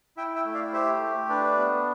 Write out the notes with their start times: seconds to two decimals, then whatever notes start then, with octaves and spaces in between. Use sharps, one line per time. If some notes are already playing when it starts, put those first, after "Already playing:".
0.17 E4 E5 G5
0.36 E5 G5
0.45 A3
0.54 D5 F5
0.73 G4 C5 E5
1.01 A3
1.29 D4 B4 D5
1.57 B3